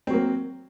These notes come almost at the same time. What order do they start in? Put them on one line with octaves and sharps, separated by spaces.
C4 F#3 A#3